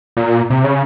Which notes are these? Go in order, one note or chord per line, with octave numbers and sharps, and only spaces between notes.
A#2
C3
C#3